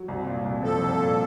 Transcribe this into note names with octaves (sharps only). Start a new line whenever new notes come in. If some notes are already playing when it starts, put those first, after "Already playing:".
Already playing: F#3
C2
A#2
C2
F3 A4
C2
A#2